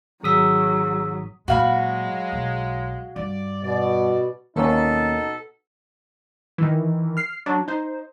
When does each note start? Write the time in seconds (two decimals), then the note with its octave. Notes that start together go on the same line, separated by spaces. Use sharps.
0.23 G#1 F#3 G#4 D#6 E6 B6
1.48 A#2 F#3 G#3 F#4 F5 B5
2.32 B1
3.16 G2 D5
3.64 B2 D5
4.56 D#2 B2 A#3 C#4 D#4 A4
6.58 D#3 E3
7.17 F6 C7
7.46 F#3 D4
7.68 D#4 C5